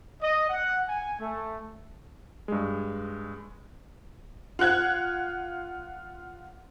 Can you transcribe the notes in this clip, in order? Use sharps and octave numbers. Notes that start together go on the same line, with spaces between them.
D#5
F#5
G#5
A3
G2 G#3
F4 F#5 F#6 G#6